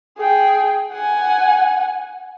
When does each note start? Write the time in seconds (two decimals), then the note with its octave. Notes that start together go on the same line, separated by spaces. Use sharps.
0.18 G#4 G5
0.92 F#5 G#5